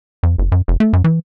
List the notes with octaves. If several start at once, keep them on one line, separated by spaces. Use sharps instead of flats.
F2
F#1
F#2
F1
A3
F#2
E3